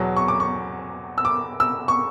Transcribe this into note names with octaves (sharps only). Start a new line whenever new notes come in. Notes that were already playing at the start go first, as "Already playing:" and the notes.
Already playing: E2 B2 F#3
C#6
D6
C#6
E6
D6
E6
C#6